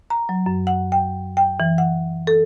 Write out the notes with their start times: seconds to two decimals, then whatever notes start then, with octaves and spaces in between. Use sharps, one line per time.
0.10 A#5
0.29 F#3
0.46 F#2
0.67 F#5
0.92 G5
1.37 G5
1.60 E3
1.78 F#5
2.27 A4